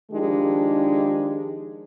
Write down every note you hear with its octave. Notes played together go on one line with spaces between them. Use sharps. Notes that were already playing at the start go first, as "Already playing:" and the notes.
D#3 F3 G#3 D4 D#4 G4